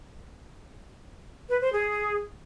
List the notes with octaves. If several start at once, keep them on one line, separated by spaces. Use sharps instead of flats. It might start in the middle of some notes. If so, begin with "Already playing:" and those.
B4
C5
G#4